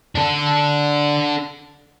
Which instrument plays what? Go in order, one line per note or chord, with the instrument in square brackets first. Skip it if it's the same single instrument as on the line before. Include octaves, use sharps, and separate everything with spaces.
[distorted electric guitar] D4 A4